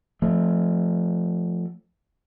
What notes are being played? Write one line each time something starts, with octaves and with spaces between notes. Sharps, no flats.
F3 A3